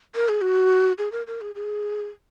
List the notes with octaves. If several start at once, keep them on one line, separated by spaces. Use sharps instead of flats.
A#4
G#4
F#4
G#4
A#4
A#4
G#4
G#4